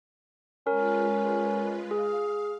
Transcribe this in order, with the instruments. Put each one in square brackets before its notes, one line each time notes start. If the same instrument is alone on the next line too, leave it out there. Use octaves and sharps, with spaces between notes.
[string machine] G#3 F4 B4 [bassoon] C#4 [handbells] A#4
[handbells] G#4 [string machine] F5